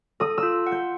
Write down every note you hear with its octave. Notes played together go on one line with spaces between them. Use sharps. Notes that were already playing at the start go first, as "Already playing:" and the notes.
A4 D#6
E6
F4
F#5
G6